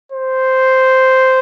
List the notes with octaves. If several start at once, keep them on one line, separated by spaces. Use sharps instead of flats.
C5